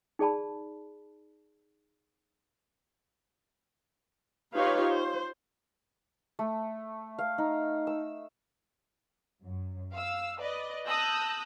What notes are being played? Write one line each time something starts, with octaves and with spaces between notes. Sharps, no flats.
D#4 G#4 D5 A5 B5
D#4 F4 G4 B4 C#5 F5
C5
A3
F5
D#4
E6
F#2
F5 E6
B4 D5 D#5
A5 D#6 E6 F#6 G6 A#6